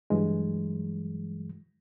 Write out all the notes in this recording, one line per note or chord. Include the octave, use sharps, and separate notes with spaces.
G2 E3 F#3 G#3